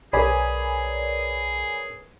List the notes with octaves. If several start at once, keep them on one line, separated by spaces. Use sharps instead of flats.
B1 G#4 A#4 B4 C#5 D5 G#5 B5